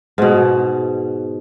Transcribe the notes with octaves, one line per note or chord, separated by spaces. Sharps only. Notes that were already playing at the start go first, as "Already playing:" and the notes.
G#2 B2